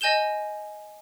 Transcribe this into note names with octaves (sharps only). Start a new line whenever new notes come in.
D#5 G#5 G6 E7 G7